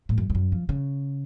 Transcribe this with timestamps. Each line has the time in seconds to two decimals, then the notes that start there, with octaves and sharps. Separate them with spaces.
0.09 A2
0.18 F#2
0.30 F2
0.35 F#2
0.52 F3
0.69 C#3